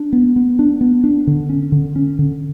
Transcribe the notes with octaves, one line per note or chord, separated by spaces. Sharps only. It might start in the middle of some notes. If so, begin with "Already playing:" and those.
Already playing: D4
B3
B3
D4
B3
D4
D3
C#4
D3
C#4
D3